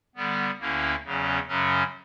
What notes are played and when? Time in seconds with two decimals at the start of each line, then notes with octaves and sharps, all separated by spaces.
0.16 D3 G3 B3
0.60 D2 D3 A#3 C#4 E4
1.04 E2 C#3 F#3 C#4
1.48 F#2 C#3 F#3 C#4